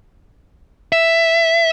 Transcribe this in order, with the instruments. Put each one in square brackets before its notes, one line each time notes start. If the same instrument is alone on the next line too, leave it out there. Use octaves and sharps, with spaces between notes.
[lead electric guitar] E5